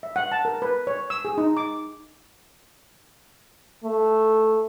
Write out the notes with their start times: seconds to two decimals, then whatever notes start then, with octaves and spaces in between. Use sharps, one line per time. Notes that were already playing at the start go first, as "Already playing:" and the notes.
0.03 E5
0.16 F#5
0.32 A5
0.45 A#4
0.62 B4
0.87 C#5
1.10 E6
1.25 G#4
1.38 D#4
1.57 D6
3.84 A3